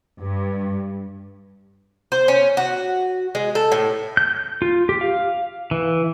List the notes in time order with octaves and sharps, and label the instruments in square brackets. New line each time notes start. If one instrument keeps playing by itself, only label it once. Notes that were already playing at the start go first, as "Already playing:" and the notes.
[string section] G2
[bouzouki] C5
C#4
F#4
G#3
A4
A2
[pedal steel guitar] G6
F4
G4
F5
E3